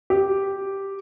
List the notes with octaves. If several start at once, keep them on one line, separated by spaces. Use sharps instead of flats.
G4